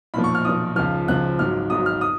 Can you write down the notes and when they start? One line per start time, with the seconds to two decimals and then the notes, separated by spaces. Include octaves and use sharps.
0.14 B1 A#2 F3 B5
0.24 C#6
0.35 F6
0.45 B1 A#2 F3 D#6
0.76 C#2 C#3 F3 F6
1.08 C#2 C#3 F3 F#6
1.39 G#1 G#2 F#3 F6
1.70 G#1 G#2 F#3 D#6
1.86 F6
2.01 D#6